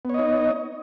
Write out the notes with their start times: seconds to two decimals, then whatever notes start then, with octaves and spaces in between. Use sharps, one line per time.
0.05 B3
0.10 C#5
0.14 D#5
0.19 D#4